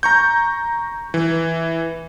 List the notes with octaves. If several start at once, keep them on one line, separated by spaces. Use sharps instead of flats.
A#5 C#6 G6
E3